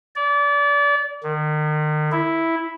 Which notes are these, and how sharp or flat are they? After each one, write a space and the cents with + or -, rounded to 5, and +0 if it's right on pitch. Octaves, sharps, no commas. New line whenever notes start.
D5 -30
D#3 -35
E4 -5